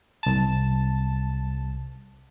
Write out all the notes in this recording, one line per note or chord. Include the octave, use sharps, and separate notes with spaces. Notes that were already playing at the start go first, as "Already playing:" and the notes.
C2 A5